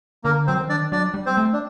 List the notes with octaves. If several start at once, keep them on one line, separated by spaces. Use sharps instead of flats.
D3 A#3 A#4
F#3 C4 C5
D#3
D4 D5
F#3 D4 D5
G3
C4 C5
A3
D4